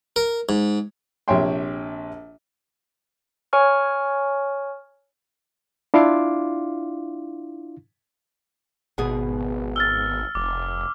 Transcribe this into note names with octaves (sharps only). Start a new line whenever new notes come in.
A#4
G#2
A#1 C3 C#5 E5 G5 C6
C#5 G#5 C#6 F6
D4 E4 F4 F5 C6 D6
G#1 B2 B3 G#4
E6 F6 A6 G7
F1 D6